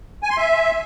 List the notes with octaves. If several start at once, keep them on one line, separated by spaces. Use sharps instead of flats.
G#5
C6
E5